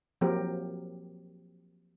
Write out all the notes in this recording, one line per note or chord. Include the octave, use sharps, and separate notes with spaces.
F3 F#3 A#3 C4 G4 A#4